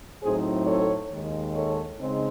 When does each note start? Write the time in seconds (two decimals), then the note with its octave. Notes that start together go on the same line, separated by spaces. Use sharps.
0.23 A2 F#3 C4 D#4 G#4 C5
0.67 A4 C#5
1.11 D#2 D#3 G#3
1.55 A4 C#5
1.99 C#3 G#3 C4 D#4